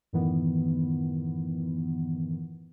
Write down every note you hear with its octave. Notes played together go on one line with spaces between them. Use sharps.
F#2 A2 D#3 E3 B3